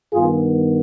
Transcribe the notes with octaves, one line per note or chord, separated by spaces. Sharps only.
G2 D#3 B3 F4 G#4